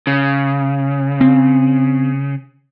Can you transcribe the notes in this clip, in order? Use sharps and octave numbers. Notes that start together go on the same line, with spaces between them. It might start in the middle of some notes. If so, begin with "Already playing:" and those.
C#3
C4